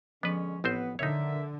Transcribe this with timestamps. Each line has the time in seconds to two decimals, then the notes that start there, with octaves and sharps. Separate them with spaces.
0.23 D3 F3 G#3 B3 C#4 B4
0.64 A1 B3 C4 C5
0.99 D3 D#4 A#4 C#5 E5